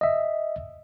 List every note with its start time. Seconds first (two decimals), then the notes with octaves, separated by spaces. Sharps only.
0.01 D#5 E5